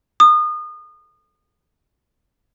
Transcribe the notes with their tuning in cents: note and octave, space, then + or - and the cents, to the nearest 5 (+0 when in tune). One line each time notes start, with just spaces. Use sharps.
D#6 -30